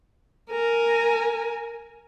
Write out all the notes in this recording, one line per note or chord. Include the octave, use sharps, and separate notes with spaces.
A#4 G#5